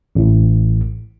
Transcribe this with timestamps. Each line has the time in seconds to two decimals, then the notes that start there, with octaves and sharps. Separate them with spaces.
0.15 A1 A2